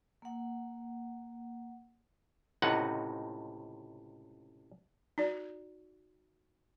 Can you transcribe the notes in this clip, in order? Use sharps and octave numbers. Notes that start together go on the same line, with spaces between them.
A#3 F#5
C#2 A2 C3 D#4 F#5
D#4 F#4 D5